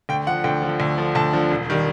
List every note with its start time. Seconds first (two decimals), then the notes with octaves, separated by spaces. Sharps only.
0.09 D2 G5
0.27 D3 F3 F#5
0.44 D2 G5
0.62 D3 F3
0.80 D2
0.98 D3 F3
1.15 D2 A5
1.33 D3 F3
1.51 E1
1.70 D#3 G3